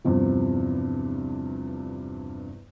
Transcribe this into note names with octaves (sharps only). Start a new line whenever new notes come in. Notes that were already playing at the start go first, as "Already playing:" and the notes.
E2 G2 C3 F3